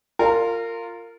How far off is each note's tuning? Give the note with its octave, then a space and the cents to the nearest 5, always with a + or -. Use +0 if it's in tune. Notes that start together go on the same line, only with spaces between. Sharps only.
F4 +0 A#4 -25